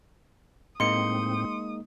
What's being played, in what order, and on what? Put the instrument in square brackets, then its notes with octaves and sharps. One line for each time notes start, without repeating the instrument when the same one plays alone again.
[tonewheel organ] A2 C4 [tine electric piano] G#3 A#3 D#4 [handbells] C6 C#7 [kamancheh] D#6